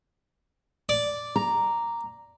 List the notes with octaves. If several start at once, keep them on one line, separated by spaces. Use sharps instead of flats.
D5
A#5